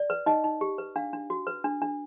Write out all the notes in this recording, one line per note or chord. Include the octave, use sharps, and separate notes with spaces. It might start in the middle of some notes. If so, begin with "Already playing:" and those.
Already playing: D5
B4
D#4 D#5
D#4
G4
B4
D4 F5
D4
F#4
B4
D4
D4